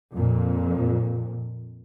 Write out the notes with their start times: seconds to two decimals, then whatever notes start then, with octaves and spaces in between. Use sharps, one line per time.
0.15 F2 A#2